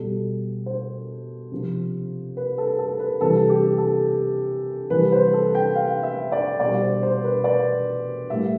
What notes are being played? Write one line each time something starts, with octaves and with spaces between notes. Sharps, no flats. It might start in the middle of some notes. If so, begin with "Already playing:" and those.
Already playing: B2 G3 A4
C5
C3 F3
B4
A4
A4
B4
C3 E3 G3 A4
G4
A4
C3 E3 G3 B4
C5
A4
G5
F5
E5
D5
B2 G3 D5
C5
C5
B4
D5
A2 G3 E5